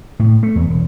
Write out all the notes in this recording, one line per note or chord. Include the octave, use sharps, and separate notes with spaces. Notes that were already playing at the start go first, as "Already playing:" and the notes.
A2
A3
E2
E1